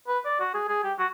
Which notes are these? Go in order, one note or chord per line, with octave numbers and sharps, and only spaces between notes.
B4
D5
F#4
G#4
G#4
G4
F#4